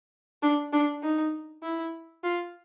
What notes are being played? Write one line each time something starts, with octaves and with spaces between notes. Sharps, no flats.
D4
D4
D#4
E4
F4